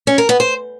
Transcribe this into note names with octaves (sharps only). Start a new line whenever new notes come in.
C#4
A#4
B3
C5